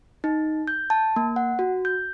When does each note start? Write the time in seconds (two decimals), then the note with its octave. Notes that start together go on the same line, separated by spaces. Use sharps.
0.24 D#4
0.68 G6
0.90 A5
1.16 A#3
1.36 F#5
1.59 F#4
1.85 G6